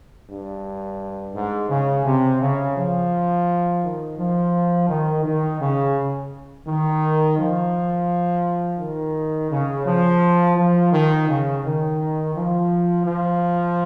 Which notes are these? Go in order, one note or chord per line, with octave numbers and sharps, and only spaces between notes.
G2
G#2
C#3
C3
C#3
F3
D#3
F3
D#3
D#3
C#3
D#3
F3
D#3
C#3
F3
F3
D#3
C#3
D#3
F3
F3